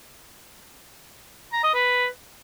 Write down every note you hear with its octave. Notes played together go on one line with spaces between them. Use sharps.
A#5
D#5
B4